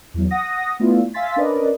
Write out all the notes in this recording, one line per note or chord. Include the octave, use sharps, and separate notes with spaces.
E2 F#3
F#5 D#6 A#6
A3 B3 D4 E4 F4
E5 F5 G#5 C6 A6 B6
C#4 D4 A#4 B4 D5 D#5